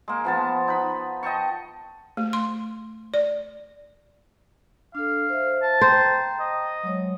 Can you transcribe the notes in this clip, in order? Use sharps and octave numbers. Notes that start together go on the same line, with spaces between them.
G#3 A#3
F3 B3 A5
D#4 B4 B5
D#5 G5 A5 C#6
A3
C6
D5
D4 A4 F5
C5 E5
A5
C5 G5 A#5
D#5
F#3 G#3 C#5